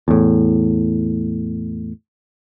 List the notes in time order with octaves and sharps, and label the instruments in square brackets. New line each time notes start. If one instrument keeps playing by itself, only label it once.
[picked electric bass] E2 A2